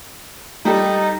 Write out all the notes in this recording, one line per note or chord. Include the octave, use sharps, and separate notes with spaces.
G3 D#4 G4 A4